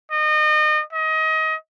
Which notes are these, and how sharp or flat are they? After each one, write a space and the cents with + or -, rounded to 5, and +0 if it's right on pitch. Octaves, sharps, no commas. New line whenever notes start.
D#5 -30
D#5 +25